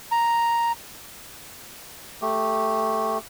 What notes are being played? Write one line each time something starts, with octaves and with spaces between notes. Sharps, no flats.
A#5
A3 G4